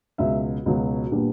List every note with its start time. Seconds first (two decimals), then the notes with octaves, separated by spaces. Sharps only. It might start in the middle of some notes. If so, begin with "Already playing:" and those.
0.18 C#2 B2 F#3 E5
0.66 C#2 B2 F#3
1.12 A#2 G3 B3 D4